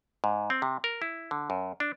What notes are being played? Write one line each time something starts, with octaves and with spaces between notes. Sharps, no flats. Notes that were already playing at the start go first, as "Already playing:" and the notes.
G#2
C4
C3
A#4
E4
D3
F#2
D4